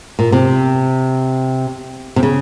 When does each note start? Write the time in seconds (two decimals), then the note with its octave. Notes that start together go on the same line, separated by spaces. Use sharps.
0.19 A#2
0.32 C3
2.16 C3
2.23 C#3